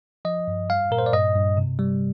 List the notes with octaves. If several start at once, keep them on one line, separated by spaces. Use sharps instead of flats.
F3 D#5
G2
G3 F5
A#2 A#4
C5
D5
G2 D#5
G2
C3
G3